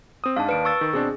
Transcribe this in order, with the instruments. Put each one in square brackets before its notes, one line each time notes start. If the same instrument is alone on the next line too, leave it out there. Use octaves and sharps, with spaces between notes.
[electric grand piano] C4 D#6
[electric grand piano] G#2 D4 [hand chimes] F5 A5
[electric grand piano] D#2 D5 [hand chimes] B4 D7
[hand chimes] C#6 E6 A6
[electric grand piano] D#3
[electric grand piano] B2 C4 D4 [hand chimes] G#4